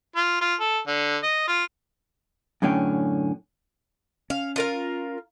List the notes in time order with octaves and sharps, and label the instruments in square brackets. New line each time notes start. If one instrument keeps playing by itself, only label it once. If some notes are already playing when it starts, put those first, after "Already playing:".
[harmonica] F4
F4
A4
D3
D#5
F4
[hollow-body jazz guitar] F#2 A2 D3 C#4 G5
[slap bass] C#4 [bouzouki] F5
[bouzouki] F4 A#4 F5